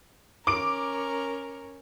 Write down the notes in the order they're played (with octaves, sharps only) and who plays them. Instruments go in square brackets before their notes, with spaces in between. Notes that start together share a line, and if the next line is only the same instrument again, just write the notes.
[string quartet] C#4 A#4 [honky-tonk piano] D6 D7